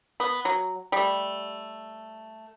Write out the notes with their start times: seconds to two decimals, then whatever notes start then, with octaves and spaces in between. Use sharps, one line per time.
0.20 B3
0.45 F#3
0.92 G3 A3